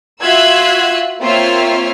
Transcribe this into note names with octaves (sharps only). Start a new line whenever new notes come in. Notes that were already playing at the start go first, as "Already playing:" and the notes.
F4 F#4 E5 E6 F#6 G#6
A#3 C4 F4 C#5 E5 F6